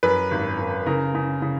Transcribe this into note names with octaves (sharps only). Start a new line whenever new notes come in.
F#2 B4
G#1
F#2
C#3 A#4
C#3
C#3